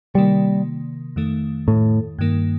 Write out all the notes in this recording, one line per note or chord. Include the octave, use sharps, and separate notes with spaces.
C3 D#3 G3 A#3
F2 D#3 A3
A2
G2 D#3 A#3